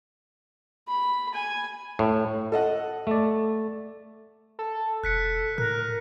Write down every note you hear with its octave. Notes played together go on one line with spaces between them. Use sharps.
B5
G#5
A2
A4 D#5 F#5
A3 D5
A4
E1 F#6 B6 C#7
A2 A#4 F#6